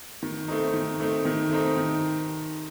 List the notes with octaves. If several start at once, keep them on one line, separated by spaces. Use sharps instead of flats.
D#3
A3 C4 D#4
D#3
A3 C4 D#4
D#3
A3 C4 D#4
D#3